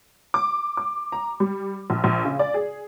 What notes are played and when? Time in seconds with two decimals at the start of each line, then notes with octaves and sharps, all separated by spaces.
0.34 D6
0.77 D6
1.12 A#5
1.40 G3
1.90 A#1
2.04 A#1
2.25 C#3
2.39 D5
2.54 G#4